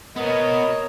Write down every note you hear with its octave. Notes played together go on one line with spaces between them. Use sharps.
B2 B3 A#4 C#5 D#5